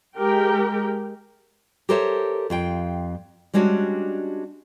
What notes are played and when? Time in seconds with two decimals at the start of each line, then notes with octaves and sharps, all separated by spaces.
0.16 G#3 G4 A#4 G5
1.89 G4 A4 A#4 C5 C#5 E5
2.50 F2 F4 G5
3.54 G3 G#3 C#4 D4 F#4